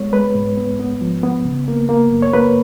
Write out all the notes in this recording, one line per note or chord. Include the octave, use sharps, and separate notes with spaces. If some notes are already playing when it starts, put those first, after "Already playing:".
Already playing: G#3 B3 C#5
G#3 B4
G#2
B3
B3
F3
B3
C#3
A#3
A#3
F#2
C#5
A#3 B4